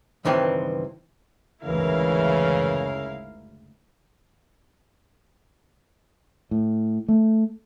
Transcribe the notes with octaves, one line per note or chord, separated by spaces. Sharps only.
C#2 G2 D#3 E3 C4
F#1 D2 G#2 C#3 E3 E4 A#4 F5
A2
A3